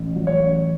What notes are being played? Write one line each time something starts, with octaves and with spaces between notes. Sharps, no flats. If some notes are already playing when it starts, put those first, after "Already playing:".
Already playing: A1
F#3
C#5
A1